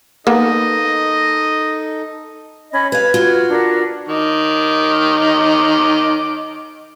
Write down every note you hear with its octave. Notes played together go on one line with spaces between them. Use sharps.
A#3 B3 D#4 A4 D#5
C#4 D#5 B5
B4 F5 G#6
F4 F#4
D4 A#4 F#5
D#3 D#5 D6